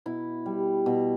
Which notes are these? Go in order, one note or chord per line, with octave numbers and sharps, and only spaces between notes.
B2 E4
G3
B2